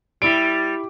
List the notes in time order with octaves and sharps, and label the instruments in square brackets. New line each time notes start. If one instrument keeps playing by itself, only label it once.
[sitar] G3 [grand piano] E4 D7